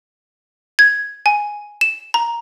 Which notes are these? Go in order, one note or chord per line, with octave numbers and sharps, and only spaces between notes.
G#6
G#5
E7
A#5